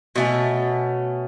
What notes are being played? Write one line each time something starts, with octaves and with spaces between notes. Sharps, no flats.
B2 A3 C#4